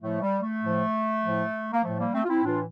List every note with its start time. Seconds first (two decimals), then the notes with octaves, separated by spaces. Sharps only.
0.01 A2 F3 A3
0.22 G3
0.41 A3
0.62 A2 F3
1.23 A2 F3
1.73 A#3
1.83 A2 F3 A3
1.98 G3 A#3
2.14 A3 C4
2.25 F4
2.29 C4 E4
2.44 A2 E3 D4 F4